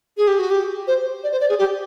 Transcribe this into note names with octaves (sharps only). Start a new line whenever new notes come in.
G#4
G4
F#4
G4
C5
D5
C5
D5
G#4
G4